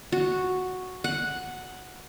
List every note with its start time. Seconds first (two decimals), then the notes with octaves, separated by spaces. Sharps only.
0.12 F#4
1.04 F#5